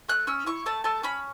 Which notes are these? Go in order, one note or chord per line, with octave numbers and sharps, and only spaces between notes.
A3 F#6
C#4 E6
E4 C#6
A3 A5
A3 A5
C#4 B5